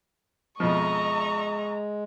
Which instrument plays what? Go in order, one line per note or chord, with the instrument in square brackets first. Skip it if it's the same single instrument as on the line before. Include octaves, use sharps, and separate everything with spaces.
[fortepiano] F2 B2 F3 [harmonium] G#3 [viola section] D#5 E5 A#5 [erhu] C#6